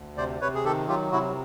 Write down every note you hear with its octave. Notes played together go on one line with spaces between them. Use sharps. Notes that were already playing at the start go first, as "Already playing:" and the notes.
Already playing: D2
C3 C5 D5
C3 B4 C#5
G#4
D#3 G4 A4
F#3 F4 G4
C3 E4 F#4